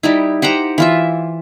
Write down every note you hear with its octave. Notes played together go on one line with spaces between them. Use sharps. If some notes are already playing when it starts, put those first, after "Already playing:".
G3 D#4 E4
G4 C5 F#5 A#5
E3 F4 E5